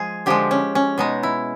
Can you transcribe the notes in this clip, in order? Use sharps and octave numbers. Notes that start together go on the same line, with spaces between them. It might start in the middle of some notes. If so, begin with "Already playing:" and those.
Already playing: F3 G#3 G#4
D3 F3 G#3 G4
C#4
C#4
B2 G#3 D#4
E4